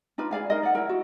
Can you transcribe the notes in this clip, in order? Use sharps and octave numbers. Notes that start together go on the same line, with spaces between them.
D4 D#4 F4 B4
G#4 D5 F5 G#5
D#4 A#4 D#5
D5 F#5
E4 A#4
F#4